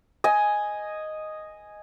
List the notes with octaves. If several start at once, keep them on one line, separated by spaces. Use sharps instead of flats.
D#5 G#5